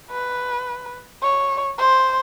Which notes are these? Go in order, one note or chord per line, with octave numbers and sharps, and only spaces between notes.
B4
C#5
C5